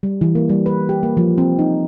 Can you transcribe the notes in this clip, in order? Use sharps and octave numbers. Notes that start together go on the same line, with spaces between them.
G3
E3
A#3
G3
B4
G4
A#3
F3
C4
D#4